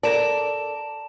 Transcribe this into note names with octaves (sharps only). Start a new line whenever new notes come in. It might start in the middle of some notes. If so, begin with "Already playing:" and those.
A4 A#4 D5 A5 E7